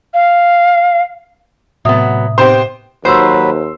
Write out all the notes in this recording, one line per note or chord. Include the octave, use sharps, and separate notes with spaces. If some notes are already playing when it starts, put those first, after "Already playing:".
F5
A2 C3 F#3 B3 E5 D#6
B3 C4 G4 C5
D#2 F#3 B4 C5 C6 E6